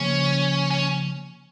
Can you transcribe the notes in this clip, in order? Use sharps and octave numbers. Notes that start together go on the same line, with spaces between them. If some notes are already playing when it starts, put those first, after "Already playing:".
Already playing: C#3 F3 A#3 C#4
C#4